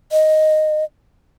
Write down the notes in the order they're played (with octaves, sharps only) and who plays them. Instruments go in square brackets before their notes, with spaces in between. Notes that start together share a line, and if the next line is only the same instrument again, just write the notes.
[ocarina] D#5